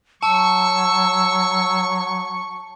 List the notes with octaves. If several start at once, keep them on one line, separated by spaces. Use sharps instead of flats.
F#3 A5 C#6 E6